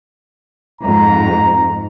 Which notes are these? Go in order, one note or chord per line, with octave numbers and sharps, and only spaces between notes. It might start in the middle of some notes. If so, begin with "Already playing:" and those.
F2 G#2 A#5